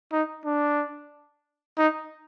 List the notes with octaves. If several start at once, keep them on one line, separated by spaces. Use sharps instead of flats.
D#4
D4
D#4